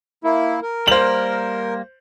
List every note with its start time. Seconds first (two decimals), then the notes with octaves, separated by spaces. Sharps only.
0.24 A#3 E4
0.62 A#4
0.88 G3 A#3 C5 F#7